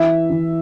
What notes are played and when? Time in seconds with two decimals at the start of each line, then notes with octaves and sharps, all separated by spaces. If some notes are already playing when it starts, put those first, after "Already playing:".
Already playing: E3 E5
0.30 E3